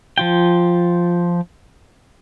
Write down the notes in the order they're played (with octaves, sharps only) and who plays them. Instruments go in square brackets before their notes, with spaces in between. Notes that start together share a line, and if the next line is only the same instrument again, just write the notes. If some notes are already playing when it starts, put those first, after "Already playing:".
[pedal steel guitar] F3 F4 G5